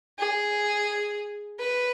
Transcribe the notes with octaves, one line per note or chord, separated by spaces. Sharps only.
G#4
B4